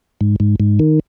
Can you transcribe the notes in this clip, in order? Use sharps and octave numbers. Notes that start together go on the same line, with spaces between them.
G#2
G#2
G#2
D#3